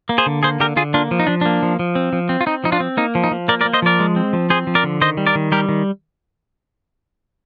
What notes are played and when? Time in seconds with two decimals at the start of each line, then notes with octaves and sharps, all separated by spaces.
0.09 A#3
0.18 G#4 C5
0.26 D3
0.43 A#3 G#4 C5
0.60 D3 G4 A#4
0.76 D3 F4 G#4
0.94 A#3 D4 F4
1.11 F3
1.20 D#4
1.27 F3 D4
1.41 A#3 D4
1.62 F3
1.79 F3
1.95 C4
2.13 F3
2.29 C4
2.41 F4
2.46 C4 D#4
2.64 F3 D#4
2.72 D4 F4
2.80 C4
2.97 A#3 D#4
3.15 F3
3.24 D#4
3.31 F3
3.48 A#3 A#4 D5
3.61 A#4 D5
3.66 A#3
3.73 C5 D#5
3.82 F3 A#4 D5
3.99 G#3
4.16 C4
4.33 F3
4.50 C4 G#4 C5
4.67 F3
4.75 A#4 D5
4.84 D3
5.01 D#3 C5 D#5
5.17 G3
5.27 A#4 D5
5.35 D#3
5.52 G3 G4 A#4
5.69 D#3